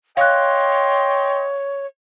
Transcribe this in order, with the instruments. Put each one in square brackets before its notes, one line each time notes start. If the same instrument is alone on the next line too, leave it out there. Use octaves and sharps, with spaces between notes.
[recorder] C#5 [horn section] D#5 G5 C6 [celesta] F5 F#6